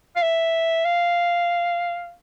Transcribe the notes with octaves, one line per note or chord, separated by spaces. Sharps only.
F5
E5
F5